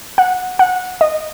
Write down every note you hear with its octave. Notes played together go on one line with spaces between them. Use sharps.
F#5
F#5
D#5